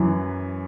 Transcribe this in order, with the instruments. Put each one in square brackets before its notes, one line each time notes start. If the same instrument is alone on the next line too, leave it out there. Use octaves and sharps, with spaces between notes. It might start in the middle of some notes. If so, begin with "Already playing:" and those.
Already playing: [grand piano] F#2 E3